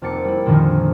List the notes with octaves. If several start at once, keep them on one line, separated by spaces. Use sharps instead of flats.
F1 F2 A#3 D6 A6 C#7
G3 E4
F2 A#2 D3 D#3 F3